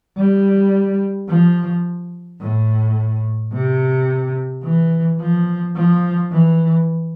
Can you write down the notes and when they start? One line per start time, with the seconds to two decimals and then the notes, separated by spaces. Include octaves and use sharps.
0.18 G3
1.29 F3
2.41 A2
3.52 C3
4.63 E3
5.20 F3
5.76 F3
6.32 E3